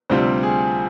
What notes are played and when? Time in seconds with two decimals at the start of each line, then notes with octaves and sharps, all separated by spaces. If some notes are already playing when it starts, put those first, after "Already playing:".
0.10 D2 C3 G3 C4 F4 C5
0.43 G#4